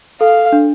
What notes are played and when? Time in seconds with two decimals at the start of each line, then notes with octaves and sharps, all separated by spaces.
0.21 A4 F5
0.52 D4